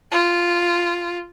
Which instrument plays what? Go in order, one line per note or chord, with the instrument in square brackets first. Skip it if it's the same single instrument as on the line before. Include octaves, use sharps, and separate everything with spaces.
[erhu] F4